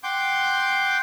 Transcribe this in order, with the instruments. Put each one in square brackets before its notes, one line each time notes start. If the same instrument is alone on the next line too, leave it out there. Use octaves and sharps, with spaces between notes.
[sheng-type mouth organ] F#5 G5 C6 D6 G6